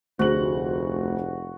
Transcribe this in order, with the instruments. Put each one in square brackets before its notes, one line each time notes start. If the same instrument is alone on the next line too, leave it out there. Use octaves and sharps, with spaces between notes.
[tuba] F1 [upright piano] D2 F#7 [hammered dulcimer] F#4 [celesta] G#4 C5